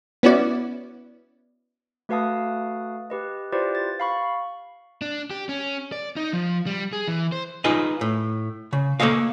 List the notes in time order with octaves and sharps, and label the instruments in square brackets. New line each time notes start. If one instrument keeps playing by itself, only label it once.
[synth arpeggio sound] B3 C#4 E4 F#4 D5
[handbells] A3 F#4 B4 F5 A5 D#6
G4 B4 D#5
E4 F4 G4 B4 C5 D5
A6
F5 B5 C#6
[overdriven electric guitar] D4
G4
C#4
D5
D#4
F3
G3
G#4
E3
C5
[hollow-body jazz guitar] D#4 F4 G#4 B4 D#5
A2
C#3
A#3 A4 C#5 D#5 F5